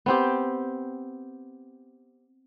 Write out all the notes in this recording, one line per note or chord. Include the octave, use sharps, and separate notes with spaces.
B3 C4 G4